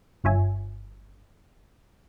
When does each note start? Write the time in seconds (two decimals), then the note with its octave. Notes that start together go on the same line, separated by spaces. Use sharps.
0.24 G1 G2 F4 C#5 E5 G#5